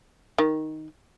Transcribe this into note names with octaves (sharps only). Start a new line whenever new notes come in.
D#3